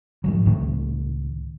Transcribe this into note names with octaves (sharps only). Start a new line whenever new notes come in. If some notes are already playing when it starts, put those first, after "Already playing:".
G#2 F3 F#3
C#2 A2 D#3 A3